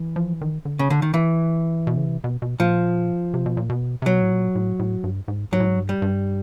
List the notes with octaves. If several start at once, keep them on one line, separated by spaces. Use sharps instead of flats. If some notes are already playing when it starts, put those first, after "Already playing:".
Already playing: E3
F3
D#3
D3
C#3
D3
D#3
E3
B2
C#3
C3
B2
B2
A#2 F3
C3
B2
A#2
B2
C3
B2 F#3
A2
A#2
A2
A2
G2
G#2
G#2 F#3
A2
G#2
G2
G3
G2